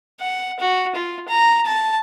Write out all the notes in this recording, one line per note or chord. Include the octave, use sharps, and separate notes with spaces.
F#5
F#4
F4
A#5
A5